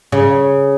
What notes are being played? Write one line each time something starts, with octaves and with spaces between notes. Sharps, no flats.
C#3